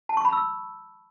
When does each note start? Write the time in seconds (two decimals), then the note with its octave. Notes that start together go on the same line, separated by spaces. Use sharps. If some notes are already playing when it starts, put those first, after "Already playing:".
0.09 A5
0.17 C#6
0.25 B5
0.33 E6